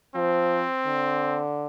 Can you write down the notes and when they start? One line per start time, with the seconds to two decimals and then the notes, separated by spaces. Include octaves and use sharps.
0.15 F3 C4
0.87 D3